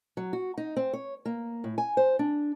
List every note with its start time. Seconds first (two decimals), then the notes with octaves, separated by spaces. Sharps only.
0.17 F#3
0.33 F#4
0.57 D#4
0.76 C4
0.93 C#5
1.25 A#3
1.64 A2
1.78 G#5
1.97 C5
2.19 D4